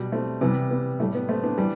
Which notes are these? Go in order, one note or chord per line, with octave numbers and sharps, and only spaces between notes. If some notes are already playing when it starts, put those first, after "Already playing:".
Already playing: B2 G3
A3 C4
C3 E3 G3 B3
B3
A2 G3 A3
B3
A3 C4
B3 D4
E3 G3